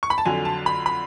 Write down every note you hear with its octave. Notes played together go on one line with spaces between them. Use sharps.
C#6
B5
A5
F2 D3 F#3 G#5
A5
B5
B5